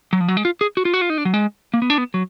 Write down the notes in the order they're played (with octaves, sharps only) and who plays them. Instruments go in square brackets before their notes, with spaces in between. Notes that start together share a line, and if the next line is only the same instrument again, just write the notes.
[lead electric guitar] F#3
F3
F#3
G#3
F4
G#4
F#4
F4
F#4
F4
D#4
D4
F#3
G#3
A#3
B3
D4
B3
F#3